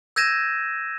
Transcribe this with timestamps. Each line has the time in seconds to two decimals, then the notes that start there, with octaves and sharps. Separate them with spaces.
0.16 E6 G6 G#6 A#6 D#7 E7